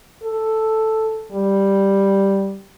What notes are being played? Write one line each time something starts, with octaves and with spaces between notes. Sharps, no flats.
A4
G3